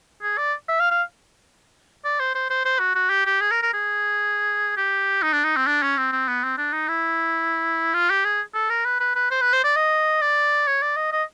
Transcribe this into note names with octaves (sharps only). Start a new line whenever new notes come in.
G#4
D5
E5
F5
F5
D5
C5
C5
C5
C5
F#4
F#4
G4
G4
G#4
A#4
A#4
G#4
G4
D#4
D4
D#4
C4
D4
C#4
C4
C4
B3
C4
D4
D#4
E4
F4
G4
G#4
A4
A#4
B4
B4
B4
C5
B4
C5
D5
D#5
D5
C#5
D5
D#5
D#5